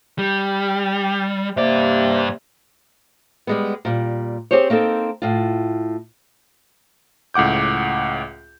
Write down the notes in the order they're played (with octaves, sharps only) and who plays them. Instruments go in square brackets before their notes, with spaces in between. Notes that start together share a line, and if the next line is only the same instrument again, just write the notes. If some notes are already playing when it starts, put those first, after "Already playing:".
[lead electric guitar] G3
[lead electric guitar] G2 D5 [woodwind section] C3 A#3
[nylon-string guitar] G3 G#3 B3
A#2 G3
C4 G4 G#4 C5 C#5
A#3 C4 D#4 A4
A2 F4
[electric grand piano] C#2 A2 F#5 D6 G6